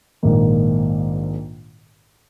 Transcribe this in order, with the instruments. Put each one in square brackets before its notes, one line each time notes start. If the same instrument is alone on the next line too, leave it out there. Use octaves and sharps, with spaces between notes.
[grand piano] A#1 G#2 D#3 A#3